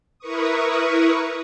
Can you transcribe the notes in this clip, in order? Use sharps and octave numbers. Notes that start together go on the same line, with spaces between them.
E4 A#4 B4 C#6 D#6